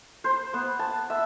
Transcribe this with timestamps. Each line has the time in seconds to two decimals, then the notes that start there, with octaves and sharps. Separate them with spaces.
0.24 C5
0.54 B3
0.79 A5
1.10 E5